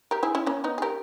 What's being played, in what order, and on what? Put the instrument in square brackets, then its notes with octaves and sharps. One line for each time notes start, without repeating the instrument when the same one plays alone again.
[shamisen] G4 A#4
E4 G#4
C#4 E4
A#3 C#4
B3 D#4
G#4
G4 A#4